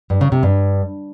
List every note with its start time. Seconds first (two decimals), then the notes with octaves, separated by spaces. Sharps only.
0.10 G2
0.21 C#3
0.32 C3
0.43 G2